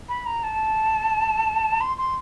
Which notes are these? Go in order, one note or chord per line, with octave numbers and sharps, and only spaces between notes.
B5
A#5
A5
C6
C6